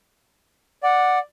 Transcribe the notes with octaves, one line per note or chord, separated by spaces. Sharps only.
D5 F#5